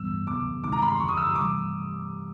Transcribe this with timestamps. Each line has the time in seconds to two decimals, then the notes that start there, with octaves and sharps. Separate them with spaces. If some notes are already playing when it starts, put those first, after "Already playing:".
Already playing: A2 E3 G3 B3 E6
0.27 C3 D#3 F#3 B3 D6
0.63 C3 D#3 G#3 C4 D#4 D6
0.72 A#5
0.82 B5
0.90 C6
1.00 F#2 D3 F3 C#6
1.08 D#6
1.17 E6
1.27 D#6
1.35 C3 E3 G3 D6